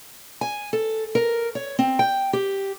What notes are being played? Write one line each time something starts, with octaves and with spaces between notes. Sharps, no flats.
G#5
A4
A#4
C#5
C4
G5
G4